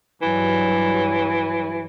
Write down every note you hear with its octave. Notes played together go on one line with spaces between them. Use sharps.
G2 E3 F#3